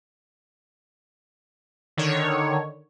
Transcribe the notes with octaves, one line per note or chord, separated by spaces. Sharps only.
D3 D#3 C#5